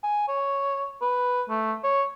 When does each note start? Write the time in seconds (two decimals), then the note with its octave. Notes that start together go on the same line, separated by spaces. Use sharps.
0.04 G#5
0.28 C#5
1.02 B4
1.50 A3
1.84 C#5